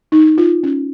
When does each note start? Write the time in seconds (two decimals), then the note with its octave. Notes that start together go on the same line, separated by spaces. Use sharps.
0.12 D#4
0.38 F4
0.63 C#4